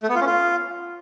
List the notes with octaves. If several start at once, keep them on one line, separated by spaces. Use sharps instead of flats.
A3
B3
F4
C#4
F4